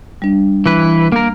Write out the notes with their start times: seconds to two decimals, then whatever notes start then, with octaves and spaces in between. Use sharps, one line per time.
0.22 G3 D4
0.66 E3 B4
1.12 A#3 A#4